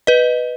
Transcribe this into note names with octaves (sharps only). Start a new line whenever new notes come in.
B4 D#5